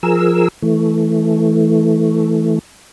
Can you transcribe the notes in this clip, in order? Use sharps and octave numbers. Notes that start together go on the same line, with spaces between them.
F3 G#4 A#4 E6
E3 A3